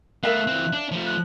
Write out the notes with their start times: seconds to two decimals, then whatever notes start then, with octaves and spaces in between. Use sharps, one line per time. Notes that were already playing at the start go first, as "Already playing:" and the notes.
0.23 A3 B3 A#4 E5 F5 F#6
0.47 E3 C4
0.73 D4
0.92 F3 A3
1.07 F#6